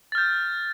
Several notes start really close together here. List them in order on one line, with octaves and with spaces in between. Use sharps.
A6 F6 G6